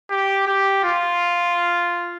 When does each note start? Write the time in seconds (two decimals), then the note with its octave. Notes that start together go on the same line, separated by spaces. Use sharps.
0.11 G4
0.47 G4
0.84 F4